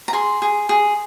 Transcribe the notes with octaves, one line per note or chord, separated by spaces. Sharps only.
A#5
G#4 C6
G#4
G#4